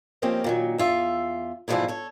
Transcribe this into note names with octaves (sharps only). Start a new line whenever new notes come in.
F3 A#3 C4 C#4 G4 D#5
A#2 D#3 F#3
E2 F4 E5
G#2 B2 E3 F3 G3 E4
A4 C#5